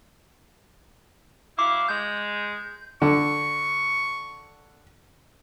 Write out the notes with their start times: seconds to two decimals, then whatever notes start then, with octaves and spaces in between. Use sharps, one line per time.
1.59 F#3 E4 F5 D6
1.88 G#3 G6
3.02 D3 C#6